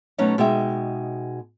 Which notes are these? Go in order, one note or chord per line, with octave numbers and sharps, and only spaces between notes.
B2 F#3 A3 C#4 D#4
B2 G#3 D#4 E5 G5